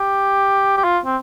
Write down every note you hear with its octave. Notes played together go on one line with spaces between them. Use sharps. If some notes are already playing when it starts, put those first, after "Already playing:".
Already playing: G4
G4
F4
C4